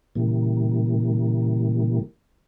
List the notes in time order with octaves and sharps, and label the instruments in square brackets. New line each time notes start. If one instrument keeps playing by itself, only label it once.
[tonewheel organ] A#2 C#3 E3 G3 A#3